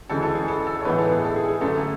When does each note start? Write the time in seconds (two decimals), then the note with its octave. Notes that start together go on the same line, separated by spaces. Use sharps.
0.09 D2 C#3 E3 G#3 A4
0.23 A4
0.35 G#4
0.48 A4
0.67 A4
0.80 C#5
0.85 A2 E3 G#3 B3 B4
0.98 A4
1.10 G#4
1.24 A4
1.36 G#4
1.48 G#4
1.61 F#2 D3 A3 A4